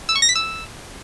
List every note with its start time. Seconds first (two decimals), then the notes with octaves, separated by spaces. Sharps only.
0.09 E6
0.15 C#6
0.22 A#6
0.29 B6
0.35 E6